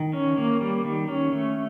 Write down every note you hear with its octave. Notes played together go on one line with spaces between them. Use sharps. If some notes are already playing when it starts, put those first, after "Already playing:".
Already playing: D#3
C#4
A#3
G3
D#3
C#4
A3